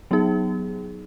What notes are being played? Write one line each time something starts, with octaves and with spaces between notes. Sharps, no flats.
F#3 B3 D#4 G#4